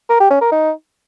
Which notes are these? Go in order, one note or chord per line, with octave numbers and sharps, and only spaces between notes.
A#4
G4
C#4
A#4
D#4